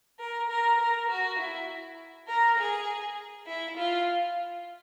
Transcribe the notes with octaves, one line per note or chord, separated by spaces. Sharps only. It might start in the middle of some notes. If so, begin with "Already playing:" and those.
A#4
A#4
A#4
F#4
E4
A#4
G#4
E4
F4